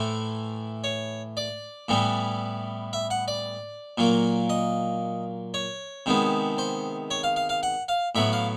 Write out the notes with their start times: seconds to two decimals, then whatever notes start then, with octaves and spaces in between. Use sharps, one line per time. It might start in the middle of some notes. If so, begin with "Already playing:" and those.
Already playing: A2 E3 A3 C5
0.84 C#5
1.37 D5
1.88 A2 E3 G3 B3
2.93 E5
3.10 F#5
3.28 D5
3.98 A#2 F#3 A#3
4.50 D#5
5.54 C#5
6.06 C3 D#3 G#3 B3
6.58 C5
7.11 C#5
7.23 F5
7.36 F5
7.49 F5
7.63 F#5
7.88 F5
8.15 A2 F#3 B3 E5
8.33 F5